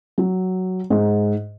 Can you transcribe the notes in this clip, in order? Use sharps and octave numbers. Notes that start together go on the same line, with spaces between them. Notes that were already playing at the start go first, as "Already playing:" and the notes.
F#3
G#2